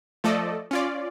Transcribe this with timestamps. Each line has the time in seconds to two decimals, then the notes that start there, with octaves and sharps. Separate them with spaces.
0.24 F3 A3 A4 D5 D#5
0.71 C#4 F4 D5